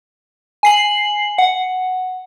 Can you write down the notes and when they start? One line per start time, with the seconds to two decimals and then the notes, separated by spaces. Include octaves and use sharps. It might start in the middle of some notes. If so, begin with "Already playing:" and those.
0.63 G#5 C7 F#7
1.38 F#5